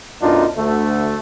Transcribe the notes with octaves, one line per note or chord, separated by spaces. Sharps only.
B1 F#2 D4 D#4 F4
D2 A3